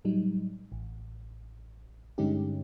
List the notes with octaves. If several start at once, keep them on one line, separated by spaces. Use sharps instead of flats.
A2 F#3 G3 D#4
A1
G2 D3 G#3 C#4 D#4 G4